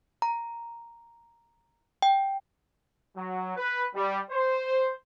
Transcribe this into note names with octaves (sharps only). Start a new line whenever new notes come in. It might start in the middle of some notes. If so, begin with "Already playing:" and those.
A#5
G5
F#3
B4
G3
C5